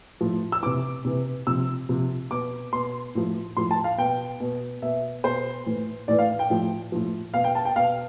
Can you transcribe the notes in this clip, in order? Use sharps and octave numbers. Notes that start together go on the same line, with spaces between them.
A2 F3
E6
C3 E3 D6
C3 E3
C3 F3 E6
C3 F3
B2 D6
B2 C6
A2 F3
A2 F3 C6
A5
F5
B2 G5
B2
B2 E5
B2 C5
A2 E3
A2 E3 D5
F5
G5
A2 F3
A2 F3
B2 F5
G5
A5
G5
B2 F5